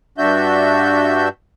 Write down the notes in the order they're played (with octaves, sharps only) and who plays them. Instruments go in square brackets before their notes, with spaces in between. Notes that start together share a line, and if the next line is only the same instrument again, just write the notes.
[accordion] G2 D4 F#4 E5 G6